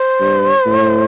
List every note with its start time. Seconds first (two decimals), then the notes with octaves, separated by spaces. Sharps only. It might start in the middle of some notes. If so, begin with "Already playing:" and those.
Already playing: C5
0.20 G2
0.66 A2